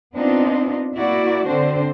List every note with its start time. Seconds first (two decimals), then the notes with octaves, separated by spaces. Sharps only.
0.15 B3 C4 D4 D#4 F4
0.96 A#3 E4 F#4 D5
1.46 D3 C4 D4 C5